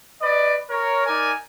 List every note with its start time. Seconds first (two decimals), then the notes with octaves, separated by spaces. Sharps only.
0.22 B4 D5 D#5
0.70 A#4 C#5
1.06 D#4 A#4 D5 G#5